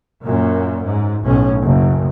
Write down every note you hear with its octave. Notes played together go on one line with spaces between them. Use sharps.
F#2 A#2
G#2
B1 A2 C#4
F#1